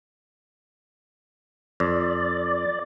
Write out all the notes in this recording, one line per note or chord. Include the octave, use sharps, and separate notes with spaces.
F2 D5